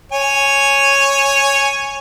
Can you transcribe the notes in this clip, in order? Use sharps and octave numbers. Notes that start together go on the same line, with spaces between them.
C#5 G#5